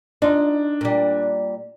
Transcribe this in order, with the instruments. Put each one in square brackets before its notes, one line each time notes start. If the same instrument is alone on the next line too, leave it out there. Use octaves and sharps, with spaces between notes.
[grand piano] D4 [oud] D#4 F4
[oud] A#2 G3